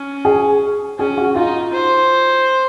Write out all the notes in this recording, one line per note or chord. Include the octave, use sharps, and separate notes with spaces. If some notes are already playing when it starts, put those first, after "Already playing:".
Already playing: C#4
G#4
C#4 G#4
F#4
D#4 F4
C5